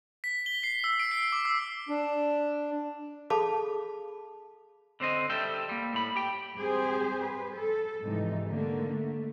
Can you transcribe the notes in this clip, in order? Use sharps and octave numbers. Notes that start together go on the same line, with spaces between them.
B6
G7
C7
E6
D7
C7
D6
E6
D4
G#4 A4 F5 A5 B5 D6
D3 C4 C5 D#5
G3 A4 E5 G5
G3 A#3
A2 B5
G4 G5
G3 C4 G4 G#4 C5
B4
A4
G#2 C3 E3 F3 G3 D#4
D3 A3 A#3
A3